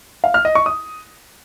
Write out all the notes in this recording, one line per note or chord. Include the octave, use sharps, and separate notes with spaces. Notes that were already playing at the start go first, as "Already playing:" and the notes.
F5
F6
D#5
C#6
D#6